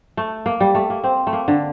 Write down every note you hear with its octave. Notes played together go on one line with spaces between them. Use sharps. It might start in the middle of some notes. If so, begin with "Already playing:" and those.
A3
A#3
G3
A3
A#3
C4
A3
A#3
D3